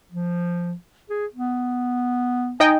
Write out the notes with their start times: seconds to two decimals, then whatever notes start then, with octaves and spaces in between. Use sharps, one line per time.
0.12 F3
1.10 G#4
1.34 B3
2.60 D#4 D#5 G5 G#5